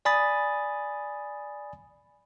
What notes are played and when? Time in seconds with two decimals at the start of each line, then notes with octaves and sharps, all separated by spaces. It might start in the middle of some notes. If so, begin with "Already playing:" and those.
0.05 D5 G#5 B5 D#6 A6